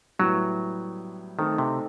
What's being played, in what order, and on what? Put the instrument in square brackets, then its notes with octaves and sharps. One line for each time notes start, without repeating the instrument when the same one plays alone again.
[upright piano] A2 G3 B3 E4 [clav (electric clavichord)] F#3
[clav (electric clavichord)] D#3 [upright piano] A3 C4 D#4 A4
[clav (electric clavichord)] C3